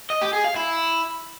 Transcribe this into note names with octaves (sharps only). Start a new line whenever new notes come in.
D#5
G4
G#4
F5
E4